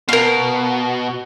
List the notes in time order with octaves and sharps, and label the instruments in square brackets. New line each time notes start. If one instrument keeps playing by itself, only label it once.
[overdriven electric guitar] B2 [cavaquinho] A#4 F5